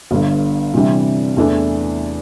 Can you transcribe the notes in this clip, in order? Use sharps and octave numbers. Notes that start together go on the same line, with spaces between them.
G1 G2 D3
C3 E3 G3 D4
E2 E3 A3 D4